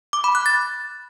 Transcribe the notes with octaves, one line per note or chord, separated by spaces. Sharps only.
D6
B5
F#6
A6